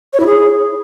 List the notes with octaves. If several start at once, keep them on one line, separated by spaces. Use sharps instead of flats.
C#5
E4
G#4